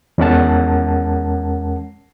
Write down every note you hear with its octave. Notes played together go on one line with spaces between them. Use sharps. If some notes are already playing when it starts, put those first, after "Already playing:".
E2 G#3 C#4 A#4 F#5 A5